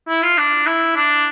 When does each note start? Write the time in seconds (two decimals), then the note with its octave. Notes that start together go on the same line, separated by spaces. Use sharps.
0.08 E4
0.23 F4
0.38 D4
0.66 E4
0.96 D4